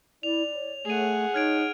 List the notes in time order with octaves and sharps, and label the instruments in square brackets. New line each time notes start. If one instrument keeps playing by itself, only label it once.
[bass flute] E4 [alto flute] D5 [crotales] F7
[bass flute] C#5
[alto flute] A3 [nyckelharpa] G#4 F#5 [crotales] D#7 F7
[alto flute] D#4 [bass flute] C#5 [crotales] F6 G#6 D7